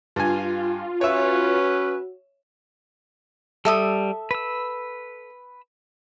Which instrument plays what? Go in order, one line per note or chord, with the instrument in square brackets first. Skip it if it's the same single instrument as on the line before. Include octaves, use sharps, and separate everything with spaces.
[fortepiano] G2 G#5 [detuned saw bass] F4
[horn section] C#4 B4 [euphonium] F#4 [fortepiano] C#5 E5
[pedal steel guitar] G3 [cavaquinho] A4 E5 D#6
[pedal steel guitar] B4 E6